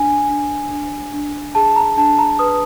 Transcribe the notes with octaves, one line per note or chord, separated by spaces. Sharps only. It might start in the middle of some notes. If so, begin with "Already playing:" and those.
Already playing: D4 G#5
D4
D4
D4
G#4 A5
A#5
D4 A5
A#5
B4 D#6